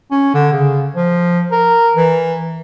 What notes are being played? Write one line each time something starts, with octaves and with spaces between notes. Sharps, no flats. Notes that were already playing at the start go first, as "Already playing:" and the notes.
C#4
D3
C#3
F3
A#4
E3